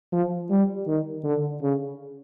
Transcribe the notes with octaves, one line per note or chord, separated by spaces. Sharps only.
F3
G3
D#3
D3
C#3